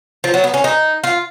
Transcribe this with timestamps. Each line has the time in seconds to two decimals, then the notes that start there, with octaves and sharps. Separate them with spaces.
0.24 F3
0.34 F#3
0.44 B3
0.54 C#4
0.64 D#4
1.04 F4